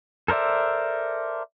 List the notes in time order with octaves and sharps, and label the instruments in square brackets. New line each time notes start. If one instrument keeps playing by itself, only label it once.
[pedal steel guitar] A4 A#4 C5 D5 E5